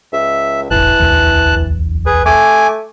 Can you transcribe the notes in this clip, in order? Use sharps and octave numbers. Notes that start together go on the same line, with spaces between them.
C#2 E5
E1 A1 E3 A5 F#6
D1 B1 E2
G#4 B4
A3 G#5 D6